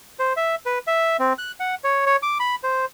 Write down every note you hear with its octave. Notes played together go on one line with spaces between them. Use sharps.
C5
E5
B4
E5
C4
F#6
F#5
C#5
C#5
D6
B5
C5